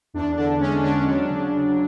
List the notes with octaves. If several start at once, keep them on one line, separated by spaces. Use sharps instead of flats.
E2 D4
D3 D4
G#3 C#4
D3 D4
F#3
C#3
C#3